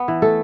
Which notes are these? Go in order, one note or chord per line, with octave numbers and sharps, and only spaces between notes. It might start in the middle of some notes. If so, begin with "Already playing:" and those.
Already playing: B3
E3
A3 A4